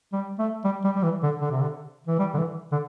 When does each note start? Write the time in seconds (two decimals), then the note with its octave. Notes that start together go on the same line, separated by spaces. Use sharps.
0.13 G3
0.39 A3
0.64 G3
0.84 G3
0.95 G3
1.03 E3
1.23 D3
1.41 D3
1.51 C3
1.61 D3
2.07 E3
2.19 G3
2.34 D3
2.38 E3
2.72 D3